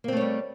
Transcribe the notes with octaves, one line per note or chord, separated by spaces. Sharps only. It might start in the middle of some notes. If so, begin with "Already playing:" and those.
G3 A3 A#3 C4 C#5